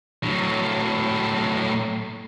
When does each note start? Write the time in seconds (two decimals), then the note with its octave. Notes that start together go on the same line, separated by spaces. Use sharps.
0.24 A2 F#3